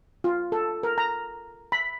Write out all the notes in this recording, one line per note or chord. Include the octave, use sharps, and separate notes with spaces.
F4
A4
A#4
A#5
B5